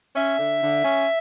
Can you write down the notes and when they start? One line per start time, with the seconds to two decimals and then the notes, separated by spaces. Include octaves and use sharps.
0.15 C#4 E5
0.39 D3
0.62 D3
0.85 C#4